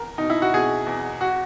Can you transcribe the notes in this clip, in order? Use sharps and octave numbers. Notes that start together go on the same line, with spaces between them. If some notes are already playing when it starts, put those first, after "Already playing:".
Already playing: E2 A#4
B2 D#4
E4
F#4
B2 G#4
E2
F#4